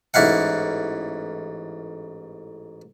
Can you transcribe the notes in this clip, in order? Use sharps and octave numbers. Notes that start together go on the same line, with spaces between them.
A1 G#2 E4 F5 F#5